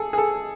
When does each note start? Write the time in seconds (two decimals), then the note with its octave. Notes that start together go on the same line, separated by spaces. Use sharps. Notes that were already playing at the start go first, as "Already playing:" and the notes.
Already playing: G#4 A4
0.13 G#4
0.18 A4